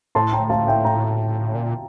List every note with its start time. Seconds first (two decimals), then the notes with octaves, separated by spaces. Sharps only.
0.15 A2 A5 C6
0.33 G5 A#5
0.50 F5 A5
0.67 E5 G5
0.84 G5 A#5
1.55 A#2